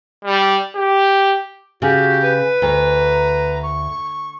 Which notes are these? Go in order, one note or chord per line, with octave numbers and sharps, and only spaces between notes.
G3
G4
C#3 F#4 G4
B4
D2 A#5
C#6